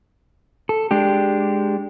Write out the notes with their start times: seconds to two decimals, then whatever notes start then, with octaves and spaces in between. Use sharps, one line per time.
0.69 A4
0.91 G#3 D4 G4